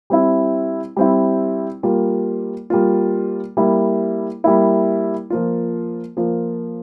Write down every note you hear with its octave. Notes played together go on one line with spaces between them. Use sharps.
G3 C4 E4
G3 C4 E4
G3 A#3 F4
G3 A#3 F4
G3 A#3 E4
G3 A#3 E4
F3 A#3 F4
F3 A#3 F4